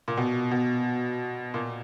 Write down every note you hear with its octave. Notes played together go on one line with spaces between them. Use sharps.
A#2
B2
B2
A#2